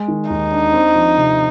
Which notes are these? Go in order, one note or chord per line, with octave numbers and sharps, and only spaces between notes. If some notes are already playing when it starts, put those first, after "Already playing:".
Already playing: G#3
D#3
D#2 D#4
D4
C4
F3
C3